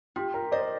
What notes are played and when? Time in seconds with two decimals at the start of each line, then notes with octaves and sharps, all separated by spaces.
0.16 F4 G4
0.34 A#4
0.52 C5 D5 D#5